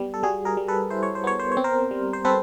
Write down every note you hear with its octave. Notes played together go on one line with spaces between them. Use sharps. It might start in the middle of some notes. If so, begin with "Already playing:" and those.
Already playing: G3 B3
A4
G3 F#4 G#4
G#4 A#4
G3
A4 B4
E4 C5
C#5
C5
B3 C#5
C5
C#5
C4
A#4 C5
G3
C5
C4 A4 B4